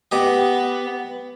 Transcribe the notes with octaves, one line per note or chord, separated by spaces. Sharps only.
B3 G4 D#5